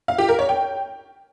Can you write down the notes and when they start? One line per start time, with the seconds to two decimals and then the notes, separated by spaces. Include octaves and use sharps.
0.08 F5
0.18 G4
0.29 A#4
0.39 C#5
0.49 G5